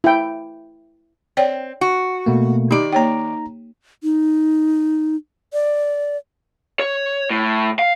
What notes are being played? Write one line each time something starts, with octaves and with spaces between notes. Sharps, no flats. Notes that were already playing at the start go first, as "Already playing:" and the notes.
E4 G5
C4 C#5 D5 G5
F#4
B2 A3 A#3
D#3 D#4 G4 D5
A#3 D#4 C#5 G5 A#5
D#4
D5
C#5
A2
F5